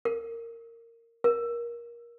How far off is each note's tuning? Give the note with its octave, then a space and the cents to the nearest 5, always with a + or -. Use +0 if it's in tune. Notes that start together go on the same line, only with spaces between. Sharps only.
A#4 -20
A#4 +20